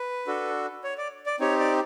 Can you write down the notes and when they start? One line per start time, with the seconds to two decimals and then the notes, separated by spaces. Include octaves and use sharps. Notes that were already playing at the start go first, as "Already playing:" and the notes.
Already playing: B4
0.27 D4 F#4 A4
0.84 C#5
0.98 D5
1.26 D5
1.40 C4 D#4 G4 C#5
1.60 D5